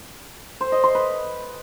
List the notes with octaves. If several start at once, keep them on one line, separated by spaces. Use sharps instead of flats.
C5
D#5
C6
B4